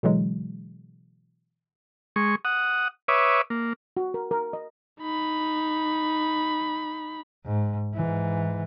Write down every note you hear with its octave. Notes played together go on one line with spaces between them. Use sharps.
B2 D3 E3 F#3 G#3
G#3 C#6
F#5 D#6
B4 C#5 E5 D6 D#6
A#3
F#4
A#4
A#4
D#5
D#4 B5
G#2
G#2 E3